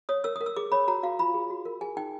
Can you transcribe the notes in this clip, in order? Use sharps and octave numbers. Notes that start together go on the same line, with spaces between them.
C#5 D#6
A#4 E6
D#6
A#4
E6
G#4 D6
C#5 B5
F#4 A#5
F#4 F5
F4 B5
G#4
F#4
A#4
G#4 G#5
D#4 G5